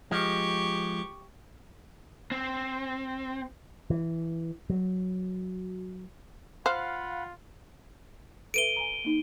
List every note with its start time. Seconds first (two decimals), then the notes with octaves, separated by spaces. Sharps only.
0.11 F3 G#3 G4 C#6
2.31 C4
3.90 E3
4.70 F#3
6.66 F4 C5 F5 F#5 B5 F6 F#6
8.54 A4 B4 E5 D7 D#7 G7
8.76 G#5 A#5
9.05 A#3 D#4